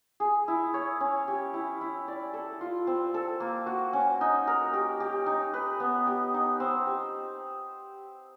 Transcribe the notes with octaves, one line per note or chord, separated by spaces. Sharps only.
G#4
E4
C#5
C#4
G4
E4
E4
D5
A4
F4
C4
A4
A#3
F#4
C#4
D#4
A#4
G4
G4
D#4
B4
B3
G4
D#4
C4
G4